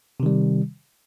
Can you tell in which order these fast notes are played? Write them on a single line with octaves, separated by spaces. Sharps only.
C3 D#3 G3